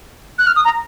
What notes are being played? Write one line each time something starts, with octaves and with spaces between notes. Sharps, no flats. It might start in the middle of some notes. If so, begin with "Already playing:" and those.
F#6
F6
D#6
A#5